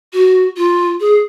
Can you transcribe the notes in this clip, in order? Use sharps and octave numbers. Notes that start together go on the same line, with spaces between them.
F#4
F4
G#4